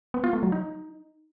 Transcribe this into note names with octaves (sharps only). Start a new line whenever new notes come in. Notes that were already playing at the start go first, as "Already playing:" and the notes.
B3
F4
A3
F#3
D#4